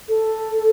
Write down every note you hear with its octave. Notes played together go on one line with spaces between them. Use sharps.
A4